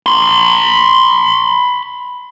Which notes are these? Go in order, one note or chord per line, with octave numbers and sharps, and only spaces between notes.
B5 C6